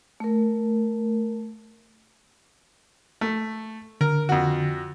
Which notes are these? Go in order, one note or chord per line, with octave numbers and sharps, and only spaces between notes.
A3 A#4
A3
D3 A#4
F2 F#4